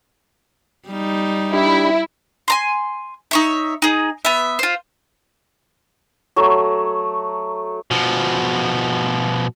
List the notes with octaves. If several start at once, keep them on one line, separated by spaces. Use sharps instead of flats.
G3 D#4
D4 E4 G4 B5
G#5 A#5 C6
D#4 C#5 E5
D#4 G#4
B3 E5
F4 C5
F#3 A3
B2 F3